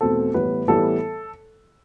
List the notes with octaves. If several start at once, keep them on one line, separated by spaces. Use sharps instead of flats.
E2 B2 A3 C4 A4
A2 E3 G3 B3 B4
A2 E3 G3 B3 A4